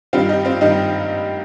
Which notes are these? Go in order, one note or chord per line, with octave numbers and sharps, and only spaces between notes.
G2 D#3 G3 C4 F4
D#4 G4
C4 F4
G2 D#3 G3 D#4